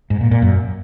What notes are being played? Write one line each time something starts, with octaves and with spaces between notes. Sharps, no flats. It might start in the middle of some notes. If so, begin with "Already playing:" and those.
G#2
A#2
A#2
F#2